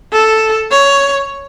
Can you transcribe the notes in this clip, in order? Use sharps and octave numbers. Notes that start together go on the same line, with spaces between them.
A4
C#5